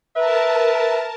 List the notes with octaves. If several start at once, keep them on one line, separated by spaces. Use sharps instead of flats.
A#4 B4 E5 A5